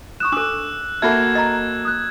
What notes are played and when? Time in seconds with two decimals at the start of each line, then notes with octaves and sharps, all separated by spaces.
0.20 C#6 D#6 F#6 E7
0.32 D4 A4 D6 E6 F#6
1.02 A#3 F#4 A4 E5 B5 F6 G#6
1.35 D#5 A#5
1.85 D#6 F#6